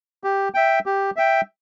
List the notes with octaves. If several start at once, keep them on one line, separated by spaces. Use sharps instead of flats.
G4
E5 G5
G4
E5 G5